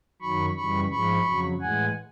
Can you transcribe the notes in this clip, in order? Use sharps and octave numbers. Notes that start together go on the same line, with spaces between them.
F#2 D#3 F#3 B5 C#6
F#2 C#3 E3 G3 B5 C#6
G#2 F3 G#3 B5 C#6
F2 C#3 F#3
A2 E3 G#3 F#5 G#5